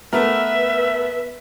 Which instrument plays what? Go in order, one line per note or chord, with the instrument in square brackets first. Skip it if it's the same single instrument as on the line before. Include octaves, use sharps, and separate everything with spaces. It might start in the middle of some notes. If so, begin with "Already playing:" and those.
[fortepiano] A3 A#4 [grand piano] B3 [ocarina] B4 [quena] E5